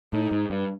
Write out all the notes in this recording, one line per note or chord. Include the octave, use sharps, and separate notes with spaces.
A2 D#4
G#2
G2